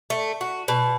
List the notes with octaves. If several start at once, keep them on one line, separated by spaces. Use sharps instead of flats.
A3
F#4
B2